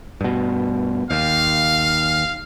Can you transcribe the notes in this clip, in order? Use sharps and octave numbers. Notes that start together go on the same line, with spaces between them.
G2 B2
D#2 F5